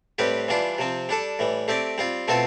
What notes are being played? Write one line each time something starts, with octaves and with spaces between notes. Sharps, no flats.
A2 G3 C4 G4 B4
E3 G3 D4 F4
C3 F3 C4
G3 D4 A4
A2 E3 G3
A3 C4 G4 D5
G3 C4 F4
B2 A3 C4 F4 A4